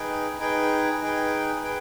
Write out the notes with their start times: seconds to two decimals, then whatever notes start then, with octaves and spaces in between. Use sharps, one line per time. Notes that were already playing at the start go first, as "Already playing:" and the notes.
Already playing: D#4 G#4 B4 G5
0.40 D#4 G#4 B4 G5
1.02 D#4 G#4 B4 G5
1.64 G#4 B4 G5